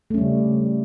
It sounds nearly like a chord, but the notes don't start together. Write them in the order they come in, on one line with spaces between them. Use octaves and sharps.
A3 C#4 G3 C#3